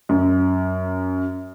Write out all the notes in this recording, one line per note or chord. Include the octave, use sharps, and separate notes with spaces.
F#2